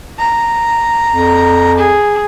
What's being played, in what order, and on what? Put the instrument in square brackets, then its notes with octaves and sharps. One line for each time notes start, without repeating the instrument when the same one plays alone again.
[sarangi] A#5
[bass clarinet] F2
[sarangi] G#4